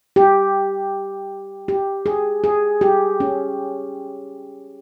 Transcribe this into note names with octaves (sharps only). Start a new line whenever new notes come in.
G4
G4
G#4
G#4
G4
C#4